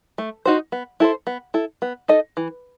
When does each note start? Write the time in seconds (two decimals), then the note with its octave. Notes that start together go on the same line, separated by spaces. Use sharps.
0.18 A3
0.46 D#4 F#4 C5
0.72 B3
1.00 E4 A4 C5
1.27 B3
1.54 E4 A4
1.82 B3
2.08 D#4 A4 D#5
2.37 E3